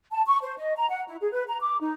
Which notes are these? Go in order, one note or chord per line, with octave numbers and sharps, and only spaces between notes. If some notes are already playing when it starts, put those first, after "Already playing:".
A5
C#6
C5
D#5
A#5
F#5
E4
G#4
B4
A#5
D6
D#4